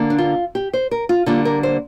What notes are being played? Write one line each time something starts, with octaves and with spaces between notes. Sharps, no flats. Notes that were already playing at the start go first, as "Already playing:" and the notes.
Already playing: D3 A#3
D4
F4
G4
C5
A#4
F4
D3 G3 A#3 F4
A#4
C5